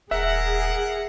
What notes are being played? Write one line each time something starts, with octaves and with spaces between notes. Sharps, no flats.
D#1 G#4 A#4 E5 F#5